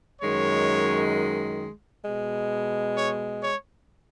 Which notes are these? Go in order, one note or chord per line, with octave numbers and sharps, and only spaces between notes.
F#2 D#3 G#3 C#5
B2 G#3
C#5
C#5